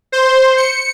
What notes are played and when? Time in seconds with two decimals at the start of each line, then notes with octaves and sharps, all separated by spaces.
0.12 C5
0.57 C#7